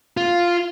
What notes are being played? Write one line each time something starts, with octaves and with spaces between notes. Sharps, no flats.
F4